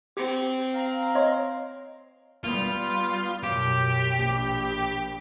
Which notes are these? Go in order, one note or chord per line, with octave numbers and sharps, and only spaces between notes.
C4 G4
F5 A#5
C#5 D#5 C6
G3 B3 F4
F#2 B2 G4
A#1